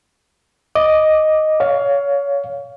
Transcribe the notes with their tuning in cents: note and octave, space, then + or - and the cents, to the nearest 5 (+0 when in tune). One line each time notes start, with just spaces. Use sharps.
D#5 +0 D6 +0
C#5 +25 F5 +5